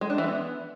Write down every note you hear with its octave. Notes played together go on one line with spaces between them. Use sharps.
G#3
D4
E3
B3